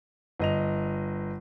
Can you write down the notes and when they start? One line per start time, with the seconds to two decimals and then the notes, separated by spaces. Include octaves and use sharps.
0.39 G1 D#5 F7